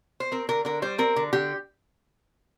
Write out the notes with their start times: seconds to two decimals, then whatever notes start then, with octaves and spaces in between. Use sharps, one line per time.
0.20 C5
0.32 C4 A#4
0.49 D3 A#4
0.65 D3 A#4
0.82 G3 C5
0.98 C4 A#4
1.16 D3
1.33 D3 G4